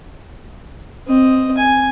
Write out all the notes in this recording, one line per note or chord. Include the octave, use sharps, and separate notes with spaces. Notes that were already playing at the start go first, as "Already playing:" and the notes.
C4 D#5
G#5